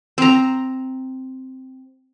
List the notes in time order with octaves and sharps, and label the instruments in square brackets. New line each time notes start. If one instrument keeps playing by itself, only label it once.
[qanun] C4 A#5